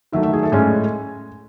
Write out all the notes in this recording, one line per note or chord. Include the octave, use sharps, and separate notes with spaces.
D#3 F#3 A3 E5
E5
G#4
A4
A2 G#3 C#4 G#5